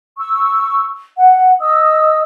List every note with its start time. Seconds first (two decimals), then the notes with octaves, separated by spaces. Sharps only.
0.18 C#6 E6
1.17 F#5
1.60 D#5 D#6 E6